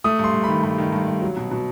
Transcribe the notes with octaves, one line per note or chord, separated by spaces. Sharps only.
A3 D#6
G2 C6
G2
D#3 B5
G2 B5
D#3
G2
G2
F#3
B2
B2